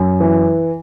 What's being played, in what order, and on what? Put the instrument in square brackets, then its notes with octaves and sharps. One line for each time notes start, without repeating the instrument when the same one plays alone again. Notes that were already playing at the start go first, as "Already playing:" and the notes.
Already playing: [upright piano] F#2
E3